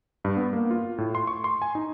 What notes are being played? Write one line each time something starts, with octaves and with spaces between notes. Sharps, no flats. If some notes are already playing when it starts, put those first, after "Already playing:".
G2
B3
A#3
F4
A2
C6
C#6
C6
G#5
D#4